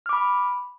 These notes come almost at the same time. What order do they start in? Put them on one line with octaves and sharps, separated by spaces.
F6 D6 B5